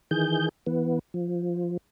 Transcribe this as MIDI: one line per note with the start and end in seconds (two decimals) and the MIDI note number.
0.11 0.49 51
0.11 0.49 52
0.11 0.49 68
0.11 0.49 91
0.66 0.99 52
0.66 0.99 59
1.14 1.77 53